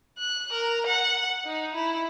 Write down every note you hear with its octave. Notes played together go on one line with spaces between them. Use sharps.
F#6
A#4
F#5
D#4
E4